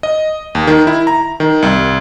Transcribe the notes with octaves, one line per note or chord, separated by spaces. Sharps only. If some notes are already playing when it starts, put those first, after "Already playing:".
D#5
D#2
D#3
E4
A#5
D#3
C2